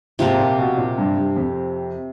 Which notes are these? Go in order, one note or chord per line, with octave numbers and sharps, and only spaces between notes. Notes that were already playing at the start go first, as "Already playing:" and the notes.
G#2 C3 F3 A#3
A#2
B2
A#2
G2
G2
F2